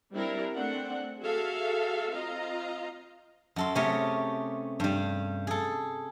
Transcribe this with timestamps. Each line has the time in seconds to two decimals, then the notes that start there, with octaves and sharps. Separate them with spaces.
0.12 G3 C4 D4 E4 A#4
0.55 A3 C4 D4 F#5
1.20 F#4 G#4 A4 E5 F5
2.12 C4 F4 D#5 F5 A#5
3.56 F#2 A4 C6
3.75 C3 A3 C#4 G4 G#4 A#4
4.80 G2 G3
5.47 G#4 A4